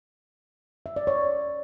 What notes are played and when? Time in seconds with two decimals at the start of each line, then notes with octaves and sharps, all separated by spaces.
0.86 E5
0.96 D5
1.07 C#5